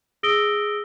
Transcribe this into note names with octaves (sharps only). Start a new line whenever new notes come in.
G#4 D#6 E6 A#6 D7 G7